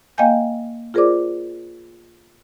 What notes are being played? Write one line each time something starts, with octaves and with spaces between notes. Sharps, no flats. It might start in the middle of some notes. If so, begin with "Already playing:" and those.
A#3 D#5 F5 G5 G#5 G6
F4 G#4 A#4 C5 D5 D6